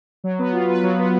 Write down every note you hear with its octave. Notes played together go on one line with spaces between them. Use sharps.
F#3
B3
F4
B4
F#3
B3